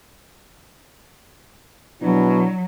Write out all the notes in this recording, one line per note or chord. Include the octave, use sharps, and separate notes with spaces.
B2 F#3 D4 E4